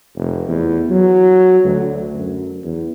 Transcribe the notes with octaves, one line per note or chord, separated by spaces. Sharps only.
F1
E2
F#3
D2
F#2
E2